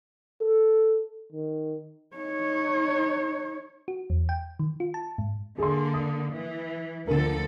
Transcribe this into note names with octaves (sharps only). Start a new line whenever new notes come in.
A4
D#3
D#4 C#5
F#4
E2
G5
D#3
F4
A5
G#2
D3 A#3 G#4 C6
D#6
E3
D2 D3 F3 A4 A#4